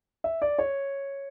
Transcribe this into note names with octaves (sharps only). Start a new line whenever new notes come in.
E5
D5
C#5